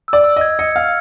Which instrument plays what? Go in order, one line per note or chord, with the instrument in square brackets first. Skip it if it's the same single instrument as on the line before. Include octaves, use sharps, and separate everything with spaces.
[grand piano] D5 [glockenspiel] E6
[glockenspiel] E6
[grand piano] D#5 [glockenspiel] G#6
[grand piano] D#5 [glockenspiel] C#7
[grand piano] F5 [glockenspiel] F6